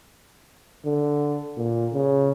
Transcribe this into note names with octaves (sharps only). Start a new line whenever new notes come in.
D3
A#2
C#3